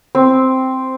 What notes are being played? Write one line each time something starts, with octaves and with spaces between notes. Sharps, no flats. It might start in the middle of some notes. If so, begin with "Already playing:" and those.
C4